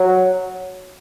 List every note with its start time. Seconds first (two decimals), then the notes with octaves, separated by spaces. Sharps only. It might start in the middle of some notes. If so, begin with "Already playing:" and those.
Already playing: F#3